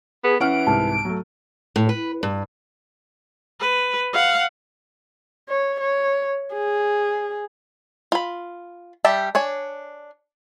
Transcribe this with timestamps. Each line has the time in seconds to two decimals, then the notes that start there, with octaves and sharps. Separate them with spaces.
0.24 B3 G#4
0.40 E3 C#4 F#5 F6 D7
0.67 C2 G#2 A5
1.05 F#3 A3
1.76 A2
1.89 B4
2.23 G2
3.60 B4
4.13 F5 F#5
5.49 C#5
5.80 C#5
6.53 G#4
8.12 F4 B5
9.05 G3 G4 E5 A5
9.35 D4 C#5 G#5